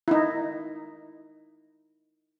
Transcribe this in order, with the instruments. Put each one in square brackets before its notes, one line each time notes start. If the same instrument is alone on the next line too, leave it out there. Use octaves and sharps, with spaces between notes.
[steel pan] D#4 E4